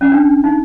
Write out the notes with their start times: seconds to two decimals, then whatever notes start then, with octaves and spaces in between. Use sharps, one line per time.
0.01 C#4
0.12 D4
0.44 D#4